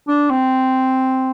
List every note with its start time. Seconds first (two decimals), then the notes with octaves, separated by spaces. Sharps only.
0.08 D4
0.30 C4